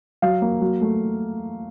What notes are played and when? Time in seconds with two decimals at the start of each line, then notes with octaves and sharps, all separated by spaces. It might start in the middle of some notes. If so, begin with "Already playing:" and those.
0.22 F#3 F5
0.42 A#3
0.61 F#3
0.81 A3